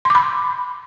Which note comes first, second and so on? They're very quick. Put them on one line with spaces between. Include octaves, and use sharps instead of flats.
C6 D6 B5